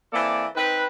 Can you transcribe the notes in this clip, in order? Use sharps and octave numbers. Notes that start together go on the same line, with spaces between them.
E3 A#3 C4 A4 D5
C4 D#4 B4